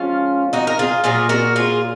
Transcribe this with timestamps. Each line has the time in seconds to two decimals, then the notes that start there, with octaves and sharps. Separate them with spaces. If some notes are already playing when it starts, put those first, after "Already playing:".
Already playing: F3 G#3 C#4 F4
0.53 D#4 F#4
0.67 A#4
0.79 F4 G#4
1.04 A#2 F#3 F4 G#4
1.29 F#4 A#4
1.56 F4 G#4